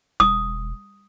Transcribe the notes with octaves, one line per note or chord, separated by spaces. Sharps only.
E1 D#6